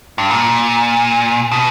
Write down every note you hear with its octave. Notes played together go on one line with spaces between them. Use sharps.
G2
A#2
B2